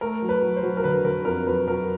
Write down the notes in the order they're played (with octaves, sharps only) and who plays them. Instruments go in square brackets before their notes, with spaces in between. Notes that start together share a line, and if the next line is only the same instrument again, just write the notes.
[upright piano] A3 A#4
F#3
B4
F#3
C5
F#3
A#4
D3 B4
D3 A#4
F2 A#4
F#3 B4
F#3 A#4